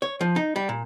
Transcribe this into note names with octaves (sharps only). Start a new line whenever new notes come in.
C#5
F3
D#4
G3
A#2